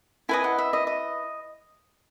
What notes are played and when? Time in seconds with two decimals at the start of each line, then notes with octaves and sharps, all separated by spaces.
0.29 E4 B4 D#5 G#5
0.44 F#5
0.58 E5
0.73 D#5
0.87 D#5